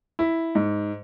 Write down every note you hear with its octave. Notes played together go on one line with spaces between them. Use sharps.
E4
G#2